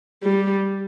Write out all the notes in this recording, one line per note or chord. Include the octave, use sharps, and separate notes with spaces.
G3